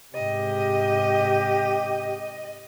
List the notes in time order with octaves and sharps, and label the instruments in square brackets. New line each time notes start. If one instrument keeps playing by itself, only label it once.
[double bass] G#2 C3 [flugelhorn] G4 [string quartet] D#5